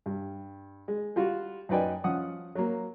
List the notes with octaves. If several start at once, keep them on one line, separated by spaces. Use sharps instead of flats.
G2
G#3
G3 F4 F#4
F#2 D#4 B4 D5 G5 G#5
F3 C#4 F#5 D#6
F#3 A#3